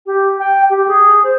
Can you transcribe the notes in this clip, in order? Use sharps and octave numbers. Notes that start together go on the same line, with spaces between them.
G4
G5
G4
G#4
C5